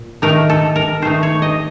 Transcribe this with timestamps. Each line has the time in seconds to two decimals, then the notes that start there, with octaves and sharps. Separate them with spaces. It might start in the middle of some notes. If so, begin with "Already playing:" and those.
Already playing: A#2
0.22 D#3 A3 D#4 A#4
0.49 A4
0.76 A#4
1.02 D#3 A3 D#4 C5
1.23 C#5
1.42 D#5